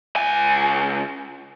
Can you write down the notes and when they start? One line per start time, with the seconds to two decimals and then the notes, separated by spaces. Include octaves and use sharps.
0.16 C#2 G#5